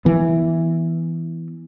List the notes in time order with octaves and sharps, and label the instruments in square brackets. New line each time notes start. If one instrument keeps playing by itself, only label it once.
[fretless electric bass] E3 B3